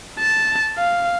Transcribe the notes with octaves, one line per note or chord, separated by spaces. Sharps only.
A5
F5